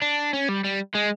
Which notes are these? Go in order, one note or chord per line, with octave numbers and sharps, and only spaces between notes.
D4
C#4
G3
G3
G#3